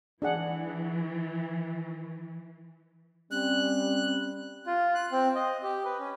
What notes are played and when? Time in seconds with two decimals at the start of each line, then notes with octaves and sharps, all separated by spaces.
0.22 E3 D4 G#4 F#5
3.31 G3 C4 C#4 F#6
4.67 F4
4.95 F#6
5.12 C4
5.35 D#5
5.63 G4
5.85 B4
5.99 C#4